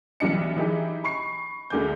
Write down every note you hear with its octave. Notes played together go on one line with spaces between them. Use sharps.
B1 E3 G3 D4 D#5 C#7
E3 D#4 G4 G#4
B5 C#6 C7
D2 D3 G#3 G#5 D6 G6